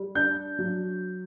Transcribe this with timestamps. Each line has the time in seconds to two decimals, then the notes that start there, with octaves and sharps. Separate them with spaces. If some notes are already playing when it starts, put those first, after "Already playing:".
Already playing: G3
0.15 D4 G6
0.59 F#3